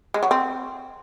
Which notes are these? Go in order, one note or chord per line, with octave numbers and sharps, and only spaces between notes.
G#3
F#3
C4